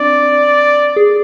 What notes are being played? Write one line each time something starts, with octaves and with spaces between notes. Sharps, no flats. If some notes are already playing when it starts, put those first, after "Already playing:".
Already playing: C4 D4 D5
G#4